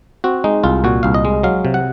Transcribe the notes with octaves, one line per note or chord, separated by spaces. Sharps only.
C4 F#4
G#3 D#4
C2 F4
A#2 F#4
C2 F5
D#5
G#3
F#3 F5
C3
F#5